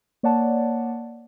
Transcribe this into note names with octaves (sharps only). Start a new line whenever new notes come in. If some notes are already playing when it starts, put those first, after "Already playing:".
A#3 C#5 D5 F#5 A5